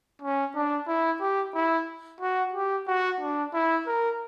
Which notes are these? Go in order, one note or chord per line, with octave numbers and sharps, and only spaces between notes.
C#4
D4
E4
G4
E4
F#4
G4
F#4
D4
E4
A#4